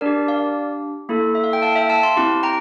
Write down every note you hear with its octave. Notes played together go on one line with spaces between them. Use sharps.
D4 G4 A#4 D5
D5 F5
A#3 E4 A4
E5
F5
G5
F5 A5
E5 G5
F5 A5
A5 C6
C4 E4 G4
G5 A#5